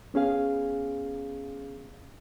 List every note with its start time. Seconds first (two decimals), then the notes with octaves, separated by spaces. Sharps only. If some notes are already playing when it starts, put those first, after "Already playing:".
0.14 B3 C#4 G#4 F5